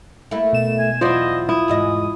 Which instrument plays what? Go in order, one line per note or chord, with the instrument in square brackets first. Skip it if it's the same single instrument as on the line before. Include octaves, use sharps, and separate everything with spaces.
[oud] A3 A#3 E4
[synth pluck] B2 E7
[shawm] G#5
[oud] E2 F#3 D5 [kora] E4 C5 [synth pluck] F4 [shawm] D#5
[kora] E4 [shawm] D#6
[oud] E2 G#2 D#5